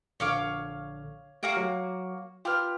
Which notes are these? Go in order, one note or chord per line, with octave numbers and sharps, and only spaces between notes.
A#1 D3 C#5 F5 D6
A3 A#3 F#4 G4 F5 D6
F#3
F4 G4 B4 F6